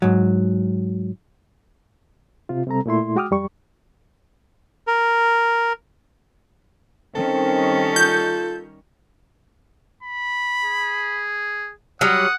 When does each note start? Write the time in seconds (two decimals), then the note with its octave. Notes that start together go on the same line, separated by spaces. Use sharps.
0.02 G#2 F#3
2.49 C3 F4
2.67 C3 G3 C4 A4 A#5
2.86 A#2 A3 E4 C6
3.16 G#3 F#4 G5 D6 D#6 F6
3.31 F2 G3 C#6
4.87 A#4
7.15 D#3 G3 C4 C#4 A4
7.96 F4 G6
10.03 B5
10.63 G#4
12.01 F#3 G3 F#5 D#6